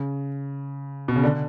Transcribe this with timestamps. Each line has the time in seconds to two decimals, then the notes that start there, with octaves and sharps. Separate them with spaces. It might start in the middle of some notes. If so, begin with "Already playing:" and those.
Already playing: C#3
1.08 B2
1.16 C#3
1.23 D3